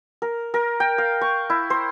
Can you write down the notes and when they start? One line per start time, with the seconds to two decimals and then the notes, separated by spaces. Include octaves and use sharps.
0.22 A#4
0.54 A#4
0.80 G5
0.98 F5
1.21 C#6
1.50 E4
1.70 C5